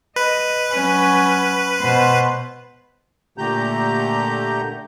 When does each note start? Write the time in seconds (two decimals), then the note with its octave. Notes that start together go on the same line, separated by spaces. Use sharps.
0.16 B4 D#5
0.73 F#3 C#4
1.80 B2 C5
3.38 A#2 D3 A3 G4 A#5 G6